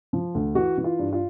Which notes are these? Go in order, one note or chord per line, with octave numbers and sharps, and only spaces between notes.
F3
D2
E3 F#4
E3
F4
G2
F4